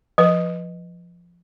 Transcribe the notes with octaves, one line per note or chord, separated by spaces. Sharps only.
F3 B4